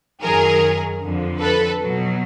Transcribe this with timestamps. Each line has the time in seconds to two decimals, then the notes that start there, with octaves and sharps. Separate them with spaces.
0.24 F#2 D#3 F#3 G#4 A#4
1.02 F2 D3 F3
1.41 A4 B4
1.80 B2 F#3